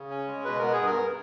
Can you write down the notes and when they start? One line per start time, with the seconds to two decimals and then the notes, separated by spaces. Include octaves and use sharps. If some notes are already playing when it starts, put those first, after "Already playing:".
Already playing: C#3
0.10 C#4
0.27 G#3
0.44 B2 B4
0.59 B3 A#4
0.73 G#4
0.81 G2
0.86 A#4